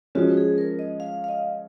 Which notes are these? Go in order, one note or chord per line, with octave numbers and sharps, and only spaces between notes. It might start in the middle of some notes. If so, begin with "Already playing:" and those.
F3 G#3 C#4 F#4
G#4
A#4
D#5
F5
F5
D#5